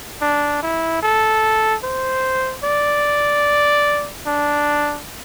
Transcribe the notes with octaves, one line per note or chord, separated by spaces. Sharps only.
D4
E4
A4
C5
D5
D4